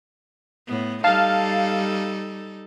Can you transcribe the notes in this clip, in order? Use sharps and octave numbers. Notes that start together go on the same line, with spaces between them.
A2 B3
G3 D#4 A4 F5 A5